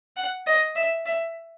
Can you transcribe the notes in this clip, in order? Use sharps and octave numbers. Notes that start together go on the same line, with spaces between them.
F#5
D#5
E5
E5